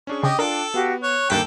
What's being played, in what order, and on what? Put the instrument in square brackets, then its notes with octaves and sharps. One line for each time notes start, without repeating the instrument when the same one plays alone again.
[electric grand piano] C#4 D4 G#4 [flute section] C#6
[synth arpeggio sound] C#3 [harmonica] G4 D#5
[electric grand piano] D4 F4 [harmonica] A4 [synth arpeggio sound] A#4 [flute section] G5
[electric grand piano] B3 [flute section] F#4 G4 F5
[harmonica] C#5 [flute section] F#6
[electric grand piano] D2 D#3 A#3 [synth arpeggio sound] G2 B6 [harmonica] A4 G5